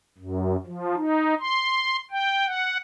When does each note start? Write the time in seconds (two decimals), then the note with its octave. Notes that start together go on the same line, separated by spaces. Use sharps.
0.18 F#2
0.66 F3
0.97 D#4
1.40 C6
2.11 G5
2.47 F#5